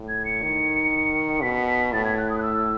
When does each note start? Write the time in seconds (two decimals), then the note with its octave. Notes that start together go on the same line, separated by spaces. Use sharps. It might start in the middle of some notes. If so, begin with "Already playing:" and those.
Already playing: A2
0.09 G#6
0.25 C#7
0.42 D#3
1.42 B2 B6
1.67 B6
1.93 A2 A6
2.04 G#6
2.18 F#6
2.30 D#6
2.38 F#6
2.43 E6